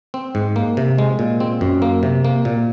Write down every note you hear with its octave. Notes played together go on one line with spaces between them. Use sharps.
C4
G#2
A#3
C3
G#3
A#2
C4
F#2
A#3
C3
A#3
A#2